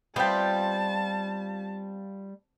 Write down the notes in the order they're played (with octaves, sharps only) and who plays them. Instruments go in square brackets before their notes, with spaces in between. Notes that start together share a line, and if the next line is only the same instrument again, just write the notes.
[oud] G3 G4 [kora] B3 C4 E5 [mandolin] F4 G5 [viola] A5